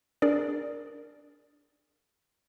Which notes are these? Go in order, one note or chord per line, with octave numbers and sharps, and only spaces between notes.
D4 G#4 A#4 D5